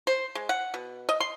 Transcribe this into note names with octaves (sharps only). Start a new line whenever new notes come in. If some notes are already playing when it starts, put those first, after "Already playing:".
C5
G#3
F#5
B2
D#5
C6